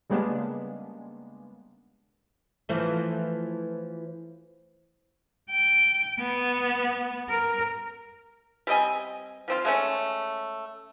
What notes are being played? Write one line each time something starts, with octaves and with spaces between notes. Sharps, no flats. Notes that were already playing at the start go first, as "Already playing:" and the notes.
C#3 G3 G#3 A#3 B3 D4
E3 F3 A3
G5
B3
A#4
G3 C4 D#5 G#5
F3 C4 F4
G#3 A3 C#4